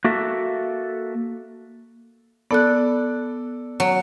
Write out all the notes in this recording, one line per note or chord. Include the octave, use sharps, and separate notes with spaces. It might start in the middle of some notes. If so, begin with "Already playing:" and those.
A#3 F#4 A4 E5
B3 A4 D5 F#6
F#3